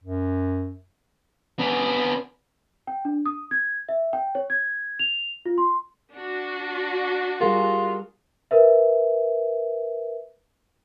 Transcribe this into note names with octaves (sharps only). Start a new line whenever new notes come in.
F#2
B3 D4
G5
D4
D#6
G#6
E5
G5
C#5
G#6
F7
F4
C6
D4 F#4
G3 F4 G#4 A#4
A#4 B4 E5